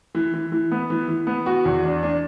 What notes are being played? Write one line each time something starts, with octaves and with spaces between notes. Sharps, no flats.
E3
E3
E3
B3
E3
E3
B3
F#4
E2
D4
D4